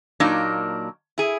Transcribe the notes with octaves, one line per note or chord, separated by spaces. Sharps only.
A#2 F#3 A#3 D4 D#4
E4 G#4